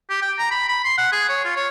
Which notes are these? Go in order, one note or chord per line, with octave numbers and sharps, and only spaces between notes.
G4
G5
A#5
B5
B5
C6
F#5
G#4
C#5
F4
C#5